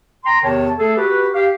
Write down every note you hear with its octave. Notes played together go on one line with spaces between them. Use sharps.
G5 A#5 C6
E2 C3 D#3 C#5 A5
A3 G#4 A4
F#4 G4 B4
G4 F5